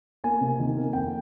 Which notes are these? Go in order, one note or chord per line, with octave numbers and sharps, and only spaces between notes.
A#3 G#5
C3
D#3
A#3
F2 G5